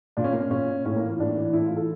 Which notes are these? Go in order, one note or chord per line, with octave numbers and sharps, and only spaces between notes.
A#2 D4
C#4
A#3
C#4
A#2 C#4
A2 C#4
A#3
E3
F4
A2 D4
E3
A2 E4
F4
E3
A4